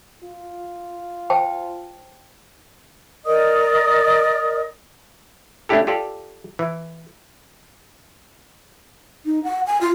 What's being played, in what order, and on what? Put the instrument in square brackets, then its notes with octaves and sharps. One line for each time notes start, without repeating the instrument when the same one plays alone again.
[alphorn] F4
[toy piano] C5 G5 A5
[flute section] A#4 D5 D#5 D#6
[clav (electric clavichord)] A3 C#4 D4 E4 G4 A4
F4 G4 A4 D5
E3
[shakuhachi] D#4
F#5
G#5
F4